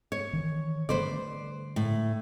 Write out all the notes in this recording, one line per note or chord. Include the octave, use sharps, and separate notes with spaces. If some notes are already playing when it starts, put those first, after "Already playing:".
C#5
D#3 E3
D3 G3 A3 B4 C5 D5
A2